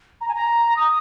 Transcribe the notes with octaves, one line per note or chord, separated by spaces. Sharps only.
A#5
G#5
A#5
D#6